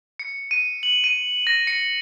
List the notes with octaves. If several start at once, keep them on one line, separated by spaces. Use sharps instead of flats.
C#7
D#7
F#7
D#7
A#6
C#7